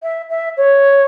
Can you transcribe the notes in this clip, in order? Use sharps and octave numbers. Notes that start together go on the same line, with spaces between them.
E5
E5
C#5